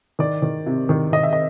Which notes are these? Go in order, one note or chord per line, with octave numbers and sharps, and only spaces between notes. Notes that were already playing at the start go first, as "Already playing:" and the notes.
D#3 D5
D#3
C3
D#3
D#3 D#5
E5
D#5